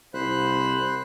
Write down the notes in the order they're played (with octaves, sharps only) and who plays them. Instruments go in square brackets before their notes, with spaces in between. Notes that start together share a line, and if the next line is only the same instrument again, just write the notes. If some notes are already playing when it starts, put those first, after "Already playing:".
[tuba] C2 [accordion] C5 B5 F#6